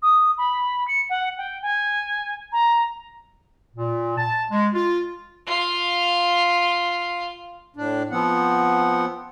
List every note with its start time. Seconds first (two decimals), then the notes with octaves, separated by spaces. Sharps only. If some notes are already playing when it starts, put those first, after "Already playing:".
0.02 D#6
0.38 B5
0.88 C#7
1.10 F#5
1.38 G5
1.62 G#5
2.52 A#5
3.76 A#2
4.18 A5
4.51 G#3
4.73 F4
5.47 F4 F5
7.76 A2 D4
8.11 F3 B3 C4 F#5